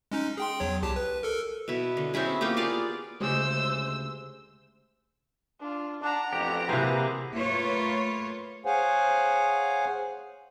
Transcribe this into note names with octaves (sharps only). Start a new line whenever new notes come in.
G#3 C#4 D#4
G#4 G5 C6
E2 F#3 C#5
C2 G4 A5
B4
A4 A#4
B2 E4
D3
C4 C#4 E4 G#4
A#3 B3 F4 G4
F4 G#4 D5 F5
D2 C#3 G#3 G4 C5 E6
D4 F4
D4 F#5 A#5
A1 F2 G4
C3 E3 A#3 G#4 B4 C5
A3 A#3 F4 B4 C#5
G#4 C5 C#5 F5 F#5 G#5